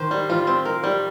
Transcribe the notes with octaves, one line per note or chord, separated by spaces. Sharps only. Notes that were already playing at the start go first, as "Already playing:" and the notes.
Already playing: D#3 C5
G3
F3 F4
C4
A#4
G3